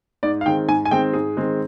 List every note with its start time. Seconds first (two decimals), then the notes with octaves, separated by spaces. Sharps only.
0.23 G#2 D5
0.41 F5
0.46 D#3 G#3 C4 G5
0.68 G#2 G#5
0.85 G#5
0.91 D#3 G#3 C4 G5
1.13 G#2 G#4
1.37 D#3 G#3 C4